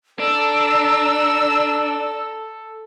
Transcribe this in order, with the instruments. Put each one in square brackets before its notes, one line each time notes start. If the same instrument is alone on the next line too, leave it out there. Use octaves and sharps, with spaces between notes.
[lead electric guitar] D4 [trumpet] A4 [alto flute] D5 [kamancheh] A#5 E6